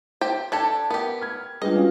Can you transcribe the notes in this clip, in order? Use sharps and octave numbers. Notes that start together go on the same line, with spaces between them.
G4 C5 G5
D4 G4 A4 G5 G#6
B3 G4 A#4
F6 G#6
G3 G#3 D4 F4 B4 D#5 G5
C#4 F#4 F5